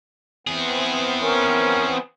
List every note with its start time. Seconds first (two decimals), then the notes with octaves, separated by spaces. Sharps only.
0.47 E3 B3 C4 G#4
1.22 C#4 A#4